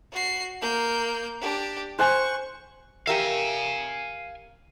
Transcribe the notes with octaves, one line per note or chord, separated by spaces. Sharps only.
F#4 C7
A#3 G6
D4 G4
C5 F#5 G#5 C#6
G4 A#4 E5 F5 G#5